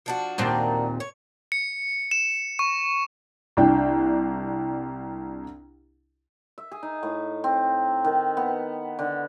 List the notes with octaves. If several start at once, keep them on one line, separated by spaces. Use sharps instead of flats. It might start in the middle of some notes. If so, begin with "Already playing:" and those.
F3 D4 F#4
D#2 A#2 C4
C#5
C#7
E7
C#6
C2 D4 G5
E5
G#4
D#4
A2
C4
D#3
B3
D3